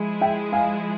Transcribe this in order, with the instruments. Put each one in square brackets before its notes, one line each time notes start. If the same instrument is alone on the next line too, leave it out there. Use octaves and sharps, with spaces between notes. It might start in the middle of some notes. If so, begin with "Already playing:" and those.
Already playing: [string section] F3 G#3 E4 G#4
[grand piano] E5 G5
F5 G#5